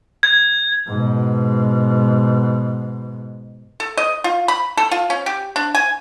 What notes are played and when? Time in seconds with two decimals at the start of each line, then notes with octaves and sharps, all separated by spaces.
0.23 G#6
0.87 G#2 B2
3.80 A4
3.97 D#5
4.24 F4
4.48 B5
4.77 A4
4.91 F4
5.10 C#4
5.26 G4
5.56 D4
5.75 G#5